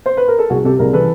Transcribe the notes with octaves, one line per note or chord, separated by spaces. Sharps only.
C5
B4
A#4
A4
C2 F#4 G#4
C3 G4 A4
C2 G#4 A#4
E3 A4 B4